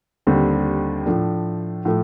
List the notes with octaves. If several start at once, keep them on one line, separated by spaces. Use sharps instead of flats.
D#2 D3 G3 C4
A2 F3 A3 D4
A2 F3 A3